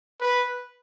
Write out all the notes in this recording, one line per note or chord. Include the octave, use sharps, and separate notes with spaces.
B4